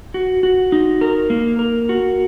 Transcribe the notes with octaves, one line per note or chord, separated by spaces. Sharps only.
F#4
F#4
D#4
A#4
A#3
A#4
F#4